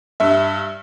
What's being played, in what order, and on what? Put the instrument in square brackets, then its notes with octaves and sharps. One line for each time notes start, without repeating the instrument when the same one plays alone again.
[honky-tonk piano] G2 E5